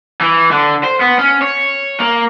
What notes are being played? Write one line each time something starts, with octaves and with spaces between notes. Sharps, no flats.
E3
D3
C5
B3
C#4
C#5
A#3